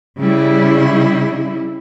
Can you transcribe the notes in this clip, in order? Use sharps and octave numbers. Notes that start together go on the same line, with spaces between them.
C#3 G3 E4